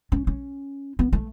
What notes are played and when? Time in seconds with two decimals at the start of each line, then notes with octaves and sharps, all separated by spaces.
0.12 C#4
0.27 C#4
0.99 B3
1.13 A3